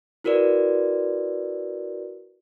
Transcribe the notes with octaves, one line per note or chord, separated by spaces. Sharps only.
E4 F#4 A#4 B4 D5